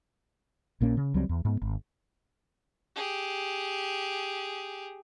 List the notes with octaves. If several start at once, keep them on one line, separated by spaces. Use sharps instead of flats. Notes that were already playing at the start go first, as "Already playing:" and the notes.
A#1 A#2 A#3 C#4
C#3
C#2 F#3 G3 C4
E2
G#2 B3
G#1
G4 G#4